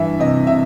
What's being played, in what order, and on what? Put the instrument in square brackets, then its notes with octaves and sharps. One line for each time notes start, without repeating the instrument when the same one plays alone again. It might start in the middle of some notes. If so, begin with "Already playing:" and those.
Already playing: [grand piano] G2 E3 E5
C3 D#5
C3 E5